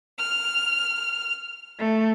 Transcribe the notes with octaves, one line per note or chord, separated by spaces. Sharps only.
F6
A3